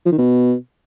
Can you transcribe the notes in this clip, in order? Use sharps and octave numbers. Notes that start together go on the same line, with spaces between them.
F3
D#3
B2